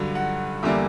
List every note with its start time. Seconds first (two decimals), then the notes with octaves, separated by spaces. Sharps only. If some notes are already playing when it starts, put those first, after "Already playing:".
Already playing: G2 D3 F#3
0.15 F#5
0.63 E2 D3 G3 A#3 E5